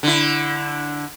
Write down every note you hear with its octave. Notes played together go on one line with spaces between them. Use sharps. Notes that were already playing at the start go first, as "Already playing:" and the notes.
D3 E4